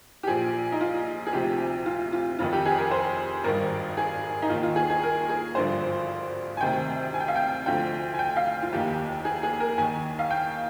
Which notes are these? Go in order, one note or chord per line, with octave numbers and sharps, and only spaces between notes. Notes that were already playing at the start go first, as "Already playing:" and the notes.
G4
A#1 A#2 F3 G#4
D#4
F4
G#4
D2 C3 F3 G4
F4
F4
F1 F2 D#3 F4
G4
G#4
A#4
C5
G#1 G2 D#3 A#4
G#4
D#4
D#2 D#3 F4
F4
G#4
G#4
A#4
G#4
G#1 G2 D3 F3 C5
G#5
D2 C3 D#3 G5
G#5
G5
F5
G5
D2 D3 F3 G5
G#5
G5
F5
F4
F1 D#2 D#3 G4
G#4
G#4
A#4
D#2 D#3 G#5
F5
G5